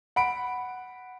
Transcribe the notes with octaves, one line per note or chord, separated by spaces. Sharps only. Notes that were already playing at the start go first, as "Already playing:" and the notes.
F#5 B5 D7